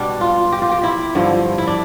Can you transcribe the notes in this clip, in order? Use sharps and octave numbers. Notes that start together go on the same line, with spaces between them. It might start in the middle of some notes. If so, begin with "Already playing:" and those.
Already playing: B2 G3 D4
F4
G4
F4
G4
E4
G2 D3 F3
E4
D4